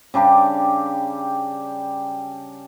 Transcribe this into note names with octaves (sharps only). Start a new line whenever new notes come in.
C#3 G3 D4 G4